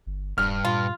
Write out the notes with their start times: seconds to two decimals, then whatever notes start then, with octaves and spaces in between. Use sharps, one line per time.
0.06 G1
0.38 D#1 G2 F6
0.65 A#2 F4